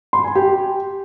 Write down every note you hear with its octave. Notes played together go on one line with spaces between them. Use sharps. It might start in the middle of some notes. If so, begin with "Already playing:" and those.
C6
G#5
G4